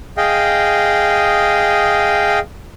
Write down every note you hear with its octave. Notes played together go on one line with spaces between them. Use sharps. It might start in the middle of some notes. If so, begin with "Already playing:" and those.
G#4 D#5 F5 G5